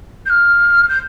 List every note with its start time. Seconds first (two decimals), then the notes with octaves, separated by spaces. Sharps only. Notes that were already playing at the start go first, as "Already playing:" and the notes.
0.26 G6
0.30 F6
0.89 G6